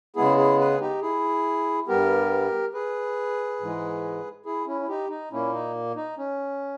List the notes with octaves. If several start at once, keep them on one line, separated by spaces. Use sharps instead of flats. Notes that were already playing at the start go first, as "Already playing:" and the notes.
C#3 G#3 B3 E4 G#4
E4 G#4
G#4 B4
D#4 G4
E4 G#4
G2 G3 B3 G4 A#4
G#4 B4
G#2 E3 G#3
E4 G#4
C#4 E4
E4
D#4 G4
D#4
A#2 A#3 C#4 E4
D#4
D#4
C#4